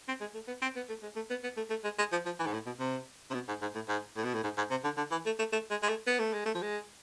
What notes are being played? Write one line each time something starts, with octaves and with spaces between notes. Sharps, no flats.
C4
G#3
A3
B3
C4
B3
A3
G#3
A3
B3
B3
A3
A3
G#3
G#3
F3
F3
E3
G#2
A2
B2
C3
C3
B2
G#2
G#2
A2
G#2
A2
B2
A2
G#2
G#2
C3
D3
D3
E3
A3
A3
A3
G#3
G#3
A3
B3
A3
G#3
A3
F3
G#3